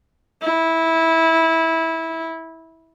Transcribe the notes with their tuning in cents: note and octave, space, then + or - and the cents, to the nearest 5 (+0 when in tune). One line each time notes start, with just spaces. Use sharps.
E4 -15